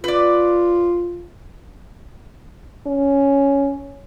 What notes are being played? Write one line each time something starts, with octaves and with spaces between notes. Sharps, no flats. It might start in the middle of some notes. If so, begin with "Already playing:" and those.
F4 B4 D5
C#4